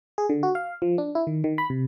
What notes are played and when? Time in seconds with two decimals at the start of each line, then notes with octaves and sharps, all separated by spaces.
0.18 G#4
0.30 D3
0.43 F#4
0.55 F5
0.82 F3
0.98 D4
1.15 E4
1.27 D#3
1.44 D#3
1.58 B5
1.70 C3